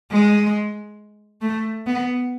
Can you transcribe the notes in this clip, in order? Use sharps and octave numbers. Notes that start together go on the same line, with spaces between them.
G#3
A3
B3